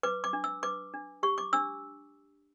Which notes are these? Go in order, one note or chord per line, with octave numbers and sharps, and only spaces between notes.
B4 D6
D6
D4
E6
B4 D6
D4
G4 C#6
D6
D4 E6